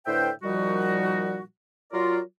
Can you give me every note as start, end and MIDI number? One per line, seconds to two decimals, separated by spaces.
0.07 0.30 45
0.07 0.30 50
0.07 0.30 71
0.07 0.30 72
0.07 0.30 76
0.07 0.30 79
0.43 1.42 46
0.43 1.42 51
0.43 1.42 53
0.43 1.42 55
0.43 1.42 63
0.43 1.42 66
1.92 2.19 54
1.92 2.19 65
1.92 2.19 70
1.92 2.19 74